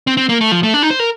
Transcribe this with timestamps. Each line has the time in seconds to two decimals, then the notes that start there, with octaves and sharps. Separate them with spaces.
0.07 C4
0.17 C4
0.29 A#3
0.41 A3
0.52 F3
0.63 A3
0.74 D4
0.83 D#4
0.91 C5
1.00 A#4